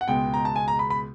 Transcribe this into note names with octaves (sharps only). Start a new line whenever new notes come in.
F#5
C#2 B2 G#3 G5
A#5
A5
G#5
A#5
B5
B5